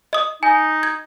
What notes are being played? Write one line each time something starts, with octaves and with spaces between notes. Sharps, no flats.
D#5 D#6
D#4 G#5
G#6